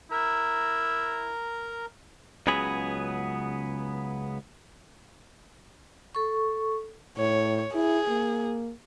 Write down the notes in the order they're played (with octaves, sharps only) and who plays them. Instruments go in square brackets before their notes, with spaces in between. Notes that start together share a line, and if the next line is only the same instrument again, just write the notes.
[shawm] E4 [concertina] A#4 A#5
[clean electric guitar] C#2 C#3 F#3 B3 G#4 B5
[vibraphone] A4 C#6
[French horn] A2 [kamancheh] C#5
[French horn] E4 [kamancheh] G#4
[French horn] A#3